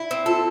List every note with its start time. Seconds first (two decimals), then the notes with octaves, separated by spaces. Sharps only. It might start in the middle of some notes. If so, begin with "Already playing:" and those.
Already playing: E4
0.11 C4
0.26 F4 A4